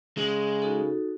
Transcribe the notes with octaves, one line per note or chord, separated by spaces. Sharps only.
C#3 G#3
D#4 F#4 A4